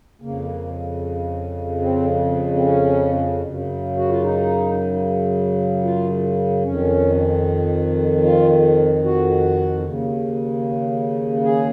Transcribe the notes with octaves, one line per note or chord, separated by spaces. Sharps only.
F2 C#3 A#3
C4
C4
C#4
F#2 C#3
F#4
F4
D#4
F4
F2 D#3 C#4
F4
F#4
D#2 C#3
G#4